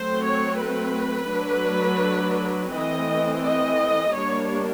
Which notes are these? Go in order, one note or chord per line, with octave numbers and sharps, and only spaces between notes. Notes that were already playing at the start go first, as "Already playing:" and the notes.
Already playing: F#3 A3 C4 C5
C#5
B4
F#3 A3 D4
E3 A3 C4 D#5
D#5
G3 A#3 D4 C#5